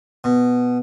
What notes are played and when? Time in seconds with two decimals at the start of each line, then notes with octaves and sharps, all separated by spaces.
0.24 B2